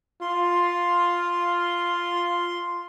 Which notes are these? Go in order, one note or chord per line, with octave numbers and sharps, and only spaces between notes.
F4 C6